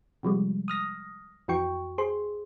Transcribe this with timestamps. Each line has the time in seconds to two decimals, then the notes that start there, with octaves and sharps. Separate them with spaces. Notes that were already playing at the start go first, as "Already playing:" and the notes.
0.23 C3 F3 G3 G#3
0.68 D#6 F6 A#6
1.48 F2 E3 F#4 G5 C#6
1.98 G#4 C5 C6